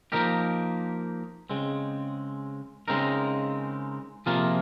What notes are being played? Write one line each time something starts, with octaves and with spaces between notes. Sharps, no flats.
F3 A#3 D#4 G4 A#4
C#3 G#3 C4
C#3 G#3 C4 D#4 A#4
C3 F3 A#3 F4 G#4